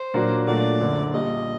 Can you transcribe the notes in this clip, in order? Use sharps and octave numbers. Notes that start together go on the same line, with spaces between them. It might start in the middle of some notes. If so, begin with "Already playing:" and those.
Already playing: C5
A#2 F#3 A#3 D4 F#4
A#2 F#3 A3 D4 F#4 D5
F#1 F#2 D3
A#1 A#2 G3 D#5